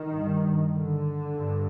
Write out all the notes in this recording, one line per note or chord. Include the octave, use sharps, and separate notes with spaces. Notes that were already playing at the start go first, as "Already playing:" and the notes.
Already playing: D#3
G2
D3
G2